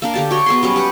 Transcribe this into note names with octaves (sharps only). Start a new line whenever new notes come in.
A#3 D4 A#4
D3 G4 A5
F#4 C#5 G5
B3 G#4 C6
F#3 G3 C#4
G4 B4 F#5